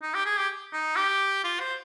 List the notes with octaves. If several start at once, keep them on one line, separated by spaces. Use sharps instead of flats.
D#4
G4
G#4
G4
D#4
G4
F4
C5